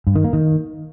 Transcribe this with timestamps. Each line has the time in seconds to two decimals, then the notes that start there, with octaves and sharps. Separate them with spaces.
0.07 G2
0.16 D#3
0.24 A#3
0.33 D#3